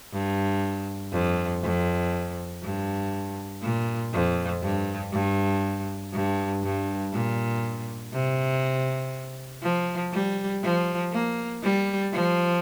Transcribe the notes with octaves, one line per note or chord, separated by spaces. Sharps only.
G2
F2
F2
G2
A#2
F2
G2
G2
G2
G2
A#2
C3
F3
G3
F3
A#3
G3
F3